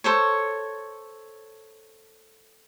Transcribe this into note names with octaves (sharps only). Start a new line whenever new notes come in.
A4 C5 C#5